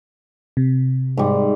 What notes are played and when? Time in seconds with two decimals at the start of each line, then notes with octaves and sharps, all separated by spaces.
0.57 C3
1.17 G#2 G3